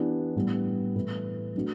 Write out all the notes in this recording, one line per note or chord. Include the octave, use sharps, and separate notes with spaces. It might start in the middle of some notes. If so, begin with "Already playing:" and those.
Already playing: E3 B3 D4 G4
A2 G3 B3
A2 E3 A3 E4 B4
F#3 A3 D4 F#4